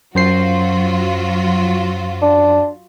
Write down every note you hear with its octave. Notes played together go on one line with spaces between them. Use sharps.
F#2 F#3 F4 F#4 C5 C7
D4